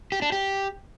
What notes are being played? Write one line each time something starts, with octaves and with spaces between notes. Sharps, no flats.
G4
D4
G4